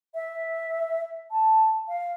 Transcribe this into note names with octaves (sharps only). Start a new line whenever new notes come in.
E5
A5
F5